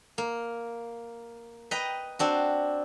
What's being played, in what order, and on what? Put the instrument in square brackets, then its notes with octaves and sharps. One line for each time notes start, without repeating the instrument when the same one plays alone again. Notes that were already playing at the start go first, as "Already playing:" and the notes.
[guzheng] A#3
B4 D#5 G5 A#5
C4 D4 F#4